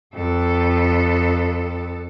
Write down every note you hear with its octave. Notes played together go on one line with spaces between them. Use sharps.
F2 A4